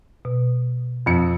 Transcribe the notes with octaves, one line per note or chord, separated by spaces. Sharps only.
B2
F2 C#7